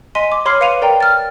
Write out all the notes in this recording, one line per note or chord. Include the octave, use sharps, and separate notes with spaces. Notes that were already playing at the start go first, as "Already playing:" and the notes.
D#5 G#5 C6 B6 D#7
D6
C#5 B5 C6 D6 F6 C7
B4 F5 C#7 D#7 F7
A#4 D5 G5 A#5
F6 A6